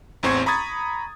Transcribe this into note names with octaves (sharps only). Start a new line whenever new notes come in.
A1 E2 C4 C6 C#6 G#6
A#5 B5 C#6 D#6 G#6 A6